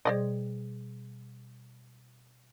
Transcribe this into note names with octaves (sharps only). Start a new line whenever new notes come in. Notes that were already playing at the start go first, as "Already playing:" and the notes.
B2 G3 G#4 C5 D5 D#5